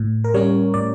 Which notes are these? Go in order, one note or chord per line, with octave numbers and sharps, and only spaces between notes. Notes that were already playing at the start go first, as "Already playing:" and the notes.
Already playing: A2
A#4
G3 C#4 C#5
A2 D5